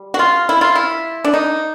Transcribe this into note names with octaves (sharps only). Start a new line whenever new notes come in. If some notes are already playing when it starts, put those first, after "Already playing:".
Already playing: G3
F#4
F4
E4
F4
E4
D4
D#4